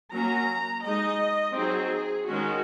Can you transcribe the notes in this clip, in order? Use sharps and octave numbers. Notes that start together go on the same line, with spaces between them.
F#3 A#3 C#4 A#5
G#3 D#4 D#5
F#3 C4 D#4 G#4
D#3 G#3 C#4 F#4